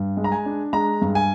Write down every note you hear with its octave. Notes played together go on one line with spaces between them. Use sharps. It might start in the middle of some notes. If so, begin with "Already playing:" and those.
Already playing: G2
G#3
A#5
G#5
D4
G#3 A#5
G2
G#5